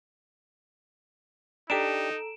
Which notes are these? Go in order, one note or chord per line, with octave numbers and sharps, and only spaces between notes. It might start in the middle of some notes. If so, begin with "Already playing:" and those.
D4 D#4 G4 A4 A#5 D7 E7